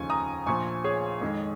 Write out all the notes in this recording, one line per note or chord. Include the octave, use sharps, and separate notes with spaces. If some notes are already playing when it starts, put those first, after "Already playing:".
Already playing: F1 D#2 C#3 F3 G#5 C#6
A#5 D#6
A#1 A#2 F3 G#5 C#6
G#4 C#5
F2 D#3 G#3